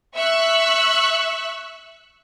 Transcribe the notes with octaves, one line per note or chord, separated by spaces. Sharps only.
E5 C#6 E6 F#6